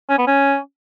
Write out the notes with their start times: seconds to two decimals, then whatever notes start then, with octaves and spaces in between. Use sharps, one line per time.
0.09 C#4
0.18 B3
0.27 C#4